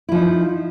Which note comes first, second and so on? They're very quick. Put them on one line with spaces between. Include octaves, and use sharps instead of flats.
E4 F3 D#4